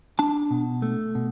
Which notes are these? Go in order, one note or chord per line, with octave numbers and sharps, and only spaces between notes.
D4 A5
B2
A3
B2